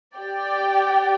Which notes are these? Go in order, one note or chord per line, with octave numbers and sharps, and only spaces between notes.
G4 D5 G5